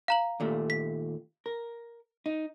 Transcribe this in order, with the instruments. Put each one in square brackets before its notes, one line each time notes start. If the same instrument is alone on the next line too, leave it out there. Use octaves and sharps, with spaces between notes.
[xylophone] F5 A#5 F#7
[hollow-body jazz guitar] D#2 A#2 A3
[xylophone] B6
[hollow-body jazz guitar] A#4
D#4